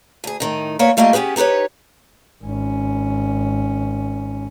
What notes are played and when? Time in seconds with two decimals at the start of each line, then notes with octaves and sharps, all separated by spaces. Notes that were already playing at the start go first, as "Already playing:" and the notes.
0.24 D2 G#4
0.40 A2 D#3 D#4
0.79 A#3 B3 B4 C#5 D5
0.97 G3 A3 A#3 F4 D#5
1.13 B3 C#4 G4 G#4 B4
1.36 B3 D#4 G4 B4 C#5
2.43 G#1 C#4